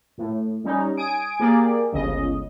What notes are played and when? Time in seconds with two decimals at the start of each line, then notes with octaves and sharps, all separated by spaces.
0.18 A2
0.64 G3 C#4 D#4
0.97 G#5 D#6 D7
1.40 A#3 G4 G#4 D5
1.92 G1 C#2 C#3 D#5